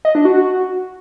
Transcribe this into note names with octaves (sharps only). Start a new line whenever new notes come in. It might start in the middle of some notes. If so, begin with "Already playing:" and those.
D#5
D4
F#4